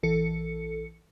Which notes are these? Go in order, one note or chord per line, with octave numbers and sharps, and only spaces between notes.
A#1 E3 A4 C#7